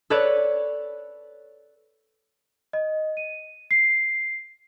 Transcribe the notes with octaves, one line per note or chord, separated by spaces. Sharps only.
A4 B4 C#5 D5
D#5
D#7
C7